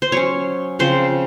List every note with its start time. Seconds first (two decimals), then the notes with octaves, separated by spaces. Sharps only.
0.02 C5
0.12 F#3 C#4 C#5
0.79 C#3 F3 C4 C5